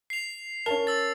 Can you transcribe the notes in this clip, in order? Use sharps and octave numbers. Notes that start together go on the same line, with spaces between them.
C7 F7
C#4 A#4 A5 F7
E6 A6